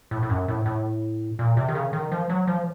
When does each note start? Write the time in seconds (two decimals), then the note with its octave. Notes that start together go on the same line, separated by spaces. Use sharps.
0.11 A2
0.23 A2
0.30 F#2
0.48 A2
0.66 A2
1.39 A#2
1.57 C3
1.68 D#3
1.75 C#3
1.93 D#3
2.12 F3
2.30 F#3
2.47 F3